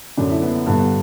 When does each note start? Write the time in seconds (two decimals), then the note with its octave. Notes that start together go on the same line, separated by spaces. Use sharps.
0.17 F#2 D3 D4
0.30 E4
0.42 B3
0.66 G2 D3 B3